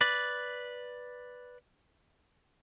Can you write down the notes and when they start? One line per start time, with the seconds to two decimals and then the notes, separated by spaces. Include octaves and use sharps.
0.01 B4 D5